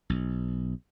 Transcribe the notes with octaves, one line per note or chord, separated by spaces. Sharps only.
B1